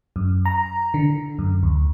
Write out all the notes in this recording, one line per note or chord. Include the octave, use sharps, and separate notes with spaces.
F#2
A#5
D3
F#2
D2